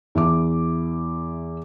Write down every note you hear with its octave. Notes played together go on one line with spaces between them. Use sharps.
E2 E5 D6